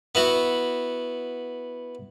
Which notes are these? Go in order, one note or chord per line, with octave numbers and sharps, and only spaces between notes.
B3 E4 F#4